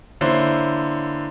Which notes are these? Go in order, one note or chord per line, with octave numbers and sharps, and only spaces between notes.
D3 A#3 E4 C5 C#5